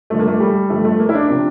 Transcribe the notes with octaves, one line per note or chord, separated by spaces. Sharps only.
G2 D3 F3 A3
A#3
A3
G3
G2 D3 F3 A3
A3
A#3
E4
D4
C3 F3